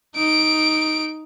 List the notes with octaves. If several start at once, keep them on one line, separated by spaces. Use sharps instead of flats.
D#4 D7